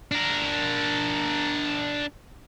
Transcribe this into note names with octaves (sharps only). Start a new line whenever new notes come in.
D4 A#4